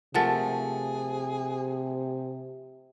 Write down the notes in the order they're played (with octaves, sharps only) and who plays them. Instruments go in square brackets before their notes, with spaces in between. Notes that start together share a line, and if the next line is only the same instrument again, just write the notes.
[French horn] C3 [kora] F3 A3 [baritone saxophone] G#4 [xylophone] A#4 F#5 A6